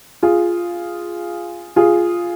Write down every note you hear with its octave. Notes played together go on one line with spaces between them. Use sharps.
F4 G#4
F4 G#4